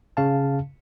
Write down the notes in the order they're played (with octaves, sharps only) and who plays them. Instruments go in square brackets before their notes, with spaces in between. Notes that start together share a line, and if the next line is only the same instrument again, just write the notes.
[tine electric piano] C#3 F5 A5